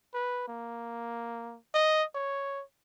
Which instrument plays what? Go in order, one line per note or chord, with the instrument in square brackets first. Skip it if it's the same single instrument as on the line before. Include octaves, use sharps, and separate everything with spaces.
[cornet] B4
A#3
D#5
C#5